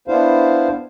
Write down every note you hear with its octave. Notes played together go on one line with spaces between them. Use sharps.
B3 D4 E4 C5 F5